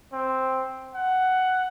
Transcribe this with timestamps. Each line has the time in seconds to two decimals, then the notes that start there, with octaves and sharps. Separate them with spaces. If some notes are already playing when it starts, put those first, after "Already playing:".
0.13 C4
0.95 F#5